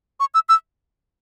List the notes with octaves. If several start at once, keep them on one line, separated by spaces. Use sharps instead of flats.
C#6
E6
E6